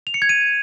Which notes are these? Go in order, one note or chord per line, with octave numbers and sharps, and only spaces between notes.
F7
C#7
G#6
D#7